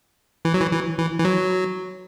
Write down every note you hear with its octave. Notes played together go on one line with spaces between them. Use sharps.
E3
F#3
E3
E3
E3
E3
F#3